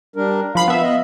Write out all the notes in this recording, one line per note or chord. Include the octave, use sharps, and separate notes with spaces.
G3 D4 A#4
F3 F5 B5 C7
B3 E5
D#5